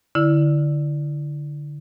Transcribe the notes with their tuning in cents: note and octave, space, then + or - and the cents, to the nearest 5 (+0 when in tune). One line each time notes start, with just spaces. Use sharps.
D3 +0 E4 +0